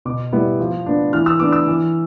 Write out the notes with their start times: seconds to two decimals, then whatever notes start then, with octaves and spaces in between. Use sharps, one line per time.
0.05 B2 D6
0.32 G3 B3 E4
0.60 F3
0.86 B3 D4
1.13 E3 F6
1.26 E6
1.40 B3 D4 D6
1.52 E6
1.68 E3